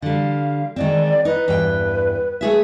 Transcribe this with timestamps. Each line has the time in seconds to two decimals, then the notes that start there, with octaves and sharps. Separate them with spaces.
0.02 D3 G3 F5
0.76 D#3 G#3 C4 D5
1.25 D#4 B4
1.48 E2 G2 G5
2.41 A3 G#4 E5